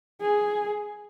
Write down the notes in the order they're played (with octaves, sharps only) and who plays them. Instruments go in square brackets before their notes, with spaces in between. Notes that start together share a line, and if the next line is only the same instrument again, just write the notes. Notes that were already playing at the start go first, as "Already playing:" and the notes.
[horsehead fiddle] G#4